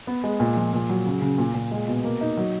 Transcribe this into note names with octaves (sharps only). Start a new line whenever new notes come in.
B3
G#3
A#2
F3
A#2
F#3
C#3
C#3
A#2
A#2
G#3
B2
A#3
D#4
F#3